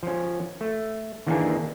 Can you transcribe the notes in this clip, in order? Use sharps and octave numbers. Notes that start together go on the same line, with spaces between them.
F3 C#4
A3
D#3 E3 A#3 D4 D#4 G#4